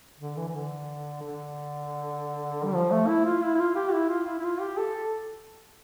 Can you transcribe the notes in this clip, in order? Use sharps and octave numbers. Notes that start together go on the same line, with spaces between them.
D3
E3
E3
D3
D3
G3
F3
A3
E4
F4
E4
E4
F4
G4
E4
F4
E4
E4
F4
G4
A4